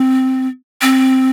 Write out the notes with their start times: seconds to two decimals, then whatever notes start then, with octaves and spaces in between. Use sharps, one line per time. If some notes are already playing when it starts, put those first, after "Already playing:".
Already playing: C4
0.82 C4